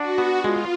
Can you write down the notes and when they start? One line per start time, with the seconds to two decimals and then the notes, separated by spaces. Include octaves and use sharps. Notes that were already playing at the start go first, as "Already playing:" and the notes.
Already playing: D4 F#4
0.18 B3
0.44 G#3 F4